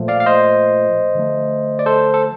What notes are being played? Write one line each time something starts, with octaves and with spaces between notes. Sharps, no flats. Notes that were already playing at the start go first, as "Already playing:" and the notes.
Already playing: A#2 F3 A3
D5 F5
F5
C5 D#5
D3 F3 A3
D5
A4 C5
A4